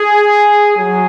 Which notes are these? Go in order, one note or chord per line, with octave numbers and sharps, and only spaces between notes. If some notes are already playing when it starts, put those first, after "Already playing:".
Already playing: G#4
F#3 G#4